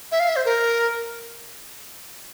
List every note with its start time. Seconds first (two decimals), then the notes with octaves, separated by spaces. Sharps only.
0.12 E5
0.20 F5
0.28 E5
0.36 C5
0.45 A#4